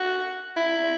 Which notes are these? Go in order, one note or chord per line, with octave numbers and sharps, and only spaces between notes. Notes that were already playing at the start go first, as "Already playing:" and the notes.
Already playing: F#4
E4